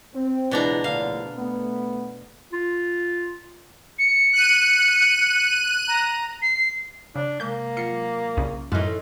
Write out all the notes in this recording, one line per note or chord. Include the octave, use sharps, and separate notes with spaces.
C4
C#2 B2 E3 D4 A#5
A#1 A2 D3 F5
A3 B3
F4
C#7
F#6 D#7
A#5
C7
C#3 D4
C3 G#3 A#3 G6
F#3 F4 C7 C#7
C2 C#3 C#4
F#2 A2 E3 A3 D#4 C6 F6 F#6